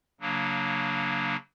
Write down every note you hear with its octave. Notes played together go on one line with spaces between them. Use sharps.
C#3 F#3 A#3 D4